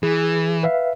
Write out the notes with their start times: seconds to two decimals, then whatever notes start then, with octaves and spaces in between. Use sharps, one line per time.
0.03 E3 G#4
0.63 B4 E5 F5